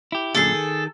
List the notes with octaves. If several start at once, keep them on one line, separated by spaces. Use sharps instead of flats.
E4 G4
F#2 A#2 D3 G#4 A4
D#3